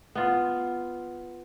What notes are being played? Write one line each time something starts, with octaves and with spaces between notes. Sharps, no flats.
B3 F4